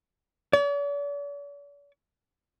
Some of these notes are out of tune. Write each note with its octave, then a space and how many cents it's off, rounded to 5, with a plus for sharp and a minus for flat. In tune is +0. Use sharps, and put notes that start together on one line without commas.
D5 -45